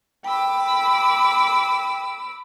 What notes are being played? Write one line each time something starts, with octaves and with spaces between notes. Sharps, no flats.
G5 B5 D6 E6